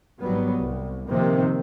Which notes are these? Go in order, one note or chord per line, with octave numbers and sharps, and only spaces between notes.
G#1 F#3 G3 B3
C2
C3 D#3 F3 A#3 C4